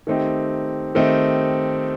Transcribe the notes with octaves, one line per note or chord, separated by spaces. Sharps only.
D#3 A3 C4 D#4 G4
D#3 A3 C4 D#4 G4